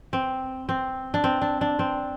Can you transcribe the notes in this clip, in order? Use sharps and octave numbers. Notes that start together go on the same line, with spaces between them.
C4
C4
D4
C4
D4
D4
C4